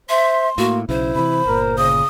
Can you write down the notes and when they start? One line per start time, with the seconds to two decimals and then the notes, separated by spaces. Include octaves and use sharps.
0.09 C5 E5 C6
0.58 A2 A#3 F#4
0.89 B1 C#3 E4 C5
1.15 C3 E3 B5
1.46 G1 A#2 A#4
1.78 C#3 D#6